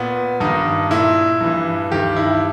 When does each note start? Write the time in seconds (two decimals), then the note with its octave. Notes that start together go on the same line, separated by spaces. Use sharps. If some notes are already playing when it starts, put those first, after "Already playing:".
Already playing: A#2 B3
0.40 G2 D#3 D#4
0.91 A#2 E4
1.41 G2 E3
1.92 G2 D#3 G4
2.17 E4